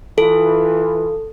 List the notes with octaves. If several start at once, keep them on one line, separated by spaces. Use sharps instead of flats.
E3 F4 A4